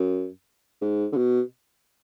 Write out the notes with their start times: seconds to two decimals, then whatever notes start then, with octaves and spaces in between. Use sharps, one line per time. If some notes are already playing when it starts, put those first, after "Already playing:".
Already playing: F#2
0.81 G#2
1.12 D3
1.16 B2